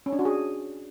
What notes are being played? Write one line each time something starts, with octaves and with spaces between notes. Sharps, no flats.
C#4
D4
F#4
G#4